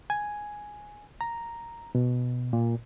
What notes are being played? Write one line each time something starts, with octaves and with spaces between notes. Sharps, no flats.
G#5
A#5
B2
A#2